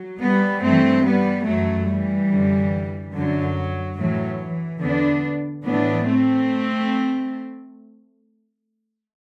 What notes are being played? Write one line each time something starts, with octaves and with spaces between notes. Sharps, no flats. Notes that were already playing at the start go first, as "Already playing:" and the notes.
Already playing: F#3
G3 B3
G2 E3 A3 C4
G3 B3
F#2 E3 F#3 A3
E3 G3
F#2 D3
F#2 D3 F#3
A2 E3 F#3
E3
E2 D3 B3 D4
A2 E3 B3 D4
A3 C4